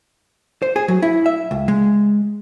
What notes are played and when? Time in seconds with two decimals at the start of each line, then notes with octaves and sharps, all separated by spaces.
0.62 C5
0.76 G#4
0.88 F#3
1.03 E4
1.26 E5
1.51 C#2
1.68 G#3